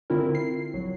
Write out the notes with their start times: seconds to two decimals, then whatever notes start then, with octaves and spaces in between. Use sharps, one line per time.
0.10 D3 C4 E4 F4 A#4
0.35 C7
0.74 A#1 F#3